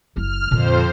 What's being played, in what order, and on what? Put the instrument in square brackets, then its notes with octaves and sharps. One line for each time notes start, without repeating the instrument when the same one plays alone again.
[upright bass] F#1 E4 [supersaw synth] F6
[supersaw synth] F2 C5 [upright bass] A#2 D3